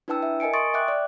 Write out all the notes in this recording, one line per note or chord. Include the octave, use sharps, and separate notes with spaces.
D4 E4 B4 G5 A5 E6
E5
A#4 D#5 G#5 C#7 D7
C6 C#6 D#6 A6 D7
E5 G5 D6 F#6
D5